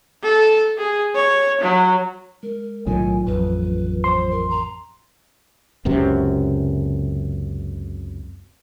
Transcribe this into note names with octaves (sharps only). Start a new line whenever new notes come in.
A4
G#4
C#5
F#3
G#3 A#4
B1 A2 D#3 F#3 F4 G#5
A1 F2 B4
C5 C6
A#4
A#5
F#1 C#2 F#2 C3